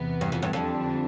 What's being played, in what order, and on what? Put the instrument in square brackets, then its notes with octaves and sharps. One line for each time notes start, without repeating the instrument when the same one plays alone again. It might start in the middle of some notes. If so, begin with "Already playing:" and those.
Already playing: [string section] E2 C3 E3 B3
[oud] G2
F2
G2
[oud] F2 [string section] D3 G3 D4